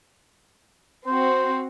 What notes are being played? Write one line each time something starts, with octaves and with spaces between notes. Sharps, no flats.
C4 F#4 C5